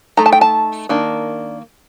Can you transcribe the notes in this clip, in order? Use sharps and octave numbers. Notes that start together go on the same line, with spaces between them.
A3 D#4 A#5
A5
G5
A5
D#3 A#3 D4